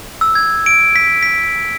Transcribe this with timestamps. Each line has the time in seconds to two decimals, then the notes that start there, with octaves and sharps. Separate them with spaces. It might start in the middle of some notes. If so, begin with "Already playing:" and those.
0.21 E6
0.35 G#6
0.66 D7
0.96 B6
1.23 B6